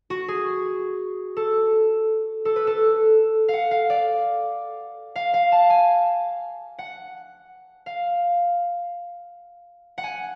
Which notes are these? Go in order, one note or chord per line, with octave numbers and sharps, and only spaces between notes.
F#4
G#4
A4
A4
B4
A4
F5 F#5
F5
D5
F5
F5
A5
G#5
F#5
F5
F#5
G#5